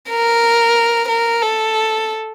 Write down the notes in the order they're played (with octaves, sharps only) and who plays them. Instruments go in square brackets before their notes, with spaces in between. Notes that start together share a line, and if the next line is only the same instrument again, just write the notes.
[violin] A#4
A#4
A4